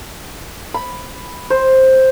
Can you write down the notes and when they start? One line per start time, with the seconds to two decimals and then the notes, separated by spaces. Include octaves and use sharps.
0.74 B5
1.50 C5